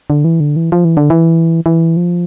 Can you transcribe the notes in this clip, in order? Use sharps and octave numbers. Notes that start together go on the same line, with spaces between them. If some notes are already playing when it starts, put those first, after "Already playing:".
D3
E3
D3
E3
F3
E3
D3
E3
E3
F3